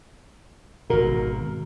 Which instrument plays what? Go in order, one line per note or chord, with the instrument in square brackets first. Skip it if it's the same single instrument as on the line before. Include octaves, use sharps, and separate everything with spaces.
[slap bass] G#1 B2 [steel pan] F#4 A#4